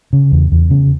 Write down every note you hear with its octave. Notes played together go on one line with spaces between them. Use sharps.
C#3
E2
E2
C#3